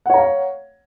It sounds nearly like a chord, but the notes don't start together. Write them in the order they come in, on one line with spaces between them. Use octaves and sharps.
F#5 C#5 A#5 F5